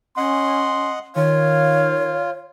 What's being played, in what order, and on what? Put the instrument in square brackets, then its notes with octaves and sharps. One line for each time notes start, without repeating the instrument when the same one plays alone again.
[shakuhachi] C#4 [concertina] D#5 F#5 [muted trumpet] C6
[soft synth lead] D#3 [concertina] F4 [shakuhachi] C#5 [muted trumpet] F5